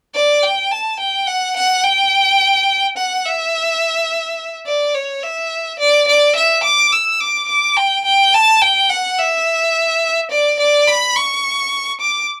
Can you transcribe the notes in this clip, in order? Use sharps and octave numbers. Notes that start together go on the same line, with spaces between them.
D5
G5
A5
G5
F#5
F#5
G5
F#5
E5
D5
C#5
E5
D5
D5
E5
D6
E6
D6
D6
G5
G5
A5
G5
F#5
E5
D5
D5
B5
C#6
D6